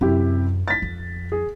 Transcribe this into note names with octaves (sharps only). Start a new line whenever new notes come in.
F#2 C3 E4 G4
A6 B6
F2
G#4